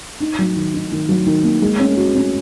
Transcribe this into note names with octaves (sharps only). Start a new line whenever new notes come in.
D#4
F#3
D#3
D#4
D#3
F#3
D#3
A#3
G#3
C#4
F#4
C#4